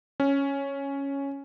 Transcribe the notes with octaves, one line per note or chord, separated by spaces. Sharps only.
C#4